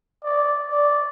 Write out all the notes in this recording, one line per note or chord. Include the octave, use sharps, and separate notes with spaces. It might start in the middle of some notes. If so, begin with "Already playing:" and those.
D5
D5